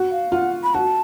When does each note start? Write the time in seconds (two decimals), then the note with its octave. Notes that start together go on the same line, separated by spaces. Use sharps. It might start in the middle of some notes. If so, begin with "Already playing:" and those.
Already playing: F#4
0.12 F5
0.32 F4 F#5
0.63 B5
0.74 F#4 A5